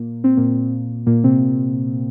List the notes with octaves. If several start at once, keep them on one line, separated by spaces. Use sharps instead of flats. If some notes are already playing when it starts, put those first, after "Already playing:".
Already playing: A#2 A#3
C4
A#2 A#3
A#2 A#3
C3 C4